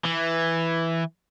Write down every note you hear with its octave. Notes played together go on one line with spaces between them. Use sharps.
E3